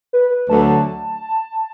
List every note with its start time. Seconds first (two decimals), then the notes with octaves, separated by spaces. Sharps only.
0.13 B4
0.31 B4
0.50 D2 D3 F#3 A3 A5